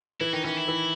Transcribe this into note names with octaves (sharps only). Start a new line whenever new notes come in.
E3 E4
D#3 D#4
E3 C#4
E4
E3